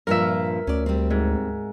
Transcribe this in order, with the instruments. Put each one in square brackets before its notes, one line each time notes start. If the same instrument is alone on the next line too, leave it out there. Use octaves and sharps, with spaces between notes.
[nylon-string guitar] G2 A#2 F3 [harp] A#4 E5
[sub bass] D2 [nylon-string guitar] C#4 D5
[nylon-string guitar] G3 C4
[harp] G#2